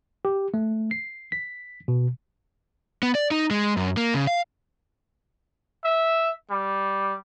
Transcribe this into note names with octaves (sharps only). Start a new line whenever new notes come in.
G4
A3
C7
B6
B2
B3
D5
D#4
G#3
F#2
A#3
C#3
F5
E5
G3